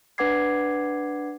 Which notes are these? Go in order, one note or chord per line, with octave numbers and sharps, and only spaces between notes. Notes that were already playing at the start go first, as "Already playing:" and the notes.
D4 B4 F#5 D6 G#6 C7